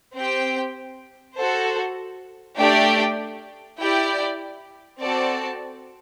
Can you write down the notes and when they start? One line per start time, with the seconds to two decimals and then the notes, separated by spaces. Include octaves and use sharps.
0.14 C4 G4 C5 G5
1.36 F#4 A4 C5
2.58 A3 D4 G4 D5 G5
3.79 E4 G4 D5 G5
5.02 C4 F#4 A4 D5 A5